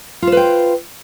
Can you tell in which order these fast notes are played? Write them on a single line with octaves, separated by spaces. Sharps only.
F4 C5 B4 G5